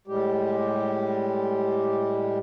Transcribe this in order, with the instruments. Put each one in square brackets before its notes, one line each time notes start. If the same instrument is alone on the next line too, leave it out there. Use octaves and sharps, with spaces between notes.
[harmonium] A2 G3 G#3 G4